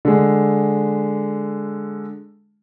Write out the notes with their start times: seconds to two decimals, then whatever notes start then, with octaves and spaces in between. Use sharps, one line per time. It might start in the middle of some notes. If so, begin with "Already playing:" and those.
0.05 D3 G#3